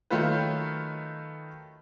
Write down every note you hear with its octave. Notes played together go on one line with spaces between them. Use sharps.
D#3 F#3 A3 F4 B4